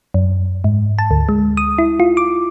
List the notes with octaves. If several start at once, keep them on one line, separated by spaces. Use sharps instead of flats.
F#2
G#2
A5
D2
G#3
D#6
E4
F4
D6